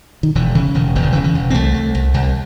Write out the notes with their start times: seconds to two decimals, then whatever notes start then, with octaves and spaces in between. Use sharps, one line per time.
0.23 D#3
0.35 E1 E3
0.55 C#3 E3
0.74 E1 D#3
0.95 E1 E3
1.03 D#3
1.12 C#3 E3
1.24 E3
1.35 E1
1.50 C4
1.54 C2 A3
1.74 C2
1.95 C2
2.14 C2